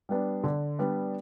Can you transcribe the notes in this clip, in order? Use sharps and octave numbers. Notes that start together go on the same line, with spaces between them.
G3 B3 D4
D3
G3 B3 D4